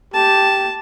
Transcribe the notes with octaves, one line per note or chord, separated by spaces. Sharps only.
G4 A5